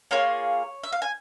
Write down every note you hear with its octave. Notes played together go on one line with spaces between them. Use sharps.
A#3 F4 G#4 C#5
E5
F5
G#5